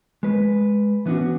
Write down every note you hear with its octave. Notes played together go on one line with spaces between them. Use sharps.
G#3 B4
E3 B3 C#4 D4 F#4